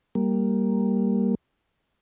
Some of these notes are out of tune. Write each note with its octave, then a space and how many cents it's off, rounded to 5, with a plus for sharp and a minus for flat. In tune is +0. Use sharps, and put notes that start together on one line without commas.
G3 +0 A#3 +0